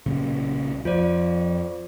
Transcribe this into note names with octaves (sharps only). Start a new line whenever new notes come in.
B1 A#2 C#3
F2 F4 C5 D5